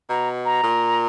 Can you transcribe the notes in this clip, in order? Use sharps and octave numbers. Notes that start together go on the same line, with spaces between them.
B2 A#5
A#5
A#2